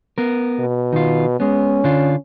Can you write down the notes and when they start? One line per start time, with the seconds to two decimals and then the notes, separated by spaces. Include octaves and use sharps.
0.18 B3 A#4
0.59 B2
0.93 D#3 F4
1.40 G#3 B3 C#4
1.84 D3 D4 F4